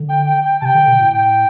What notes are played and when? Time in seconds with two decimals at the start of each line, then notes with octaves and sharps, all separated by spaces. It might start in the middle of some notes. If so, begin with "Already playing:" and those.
Already playing: D3
0.09 G5
0.26 G5
0.44 G5
0.61 C3 G5 A5
0.75 D3
0.87 B2
1.00 A2
1.13 G5